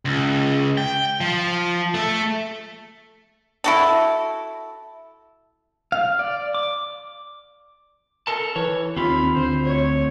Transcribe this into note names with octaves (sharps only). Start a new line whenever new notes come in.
C#2
G5
F3
A3 A4
E4 F#4 A4
F5
D5
D6
A4 A#4 A5
E3 C#5
D#2 C4 F4 B5
D2 C5
C#5